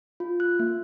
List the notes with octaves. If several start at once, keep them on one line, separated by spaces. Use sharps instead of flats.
F4
F#6
A#3